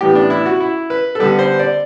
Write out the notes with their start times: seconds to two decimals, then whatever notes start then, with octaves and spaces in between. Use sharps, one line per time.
0.01 A2 E3 B3 G4
0.15 D4
0.30 E4
0.46 F#4
0.60 E4
0.90 B4
1.15 A4
1.20 D3 G3 B3 B4
1.39 C5
1.59 D5